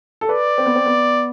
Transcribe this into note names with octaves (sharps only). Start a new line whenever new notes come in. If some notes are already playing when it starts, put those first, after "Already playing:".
A4
B4 D5
C4
B3
C4
B3